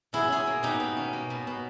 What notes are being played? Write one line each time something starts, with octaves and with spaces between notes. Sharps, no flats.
B2 E4 G#4
C#4 E4 G#4
A#3
B2 D#4 G4
B2
C#4
A#3
B2
B2